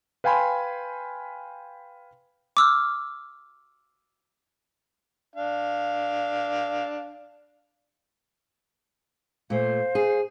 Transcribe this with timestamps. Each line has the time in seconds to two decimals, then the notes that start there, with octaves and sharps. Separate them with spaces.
0.24 B4 F5 G5 G#5 B5 C6
2.57 D6 E6 F6
5.36 D4 F5
9.50 A#2 A3 C5 F5
9.95 G#4